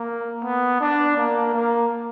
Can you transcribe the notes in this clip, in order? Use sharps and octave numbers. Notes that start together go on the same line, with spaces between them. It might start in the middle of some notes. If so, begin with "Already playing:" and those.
Already playing: A#3
B3
D4
A#3
A#3